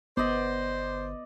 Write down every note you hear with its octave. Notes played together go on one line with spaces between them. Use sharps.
G1 B3 C5 D5 D#5